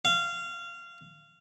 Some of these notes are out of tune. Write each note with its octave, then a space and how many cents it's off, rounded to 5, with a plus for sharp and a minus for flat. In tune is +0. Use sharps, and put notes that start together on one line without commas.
F5 -20